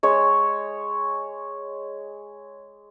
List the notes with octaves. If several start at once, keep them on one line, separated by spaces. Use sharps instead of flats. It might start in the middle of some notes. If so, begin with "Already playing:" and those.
G#3 C#5